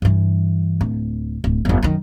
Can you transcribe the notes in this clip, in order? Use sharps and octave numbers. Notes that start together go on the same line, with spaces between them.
G2 E3
D1
D1
G1 F2
F#2 D#3